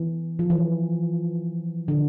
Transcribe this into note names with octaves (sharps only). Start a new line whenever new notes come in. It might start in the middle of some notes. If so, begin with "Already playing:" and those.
Already playing: E3
F3
E3
D3